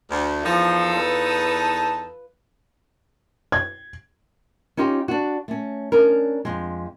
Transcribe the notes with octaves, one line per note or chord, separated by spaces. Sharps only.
D2
E2 F3 D#4 A4
B4
G#6
C#4 D#4 F4 G4
D4 F#4
A3 C#4
C#4 D4 A#4
F2 G#3